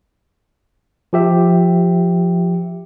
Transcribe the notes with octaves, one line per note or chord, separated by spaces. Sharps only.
F3 G4 E5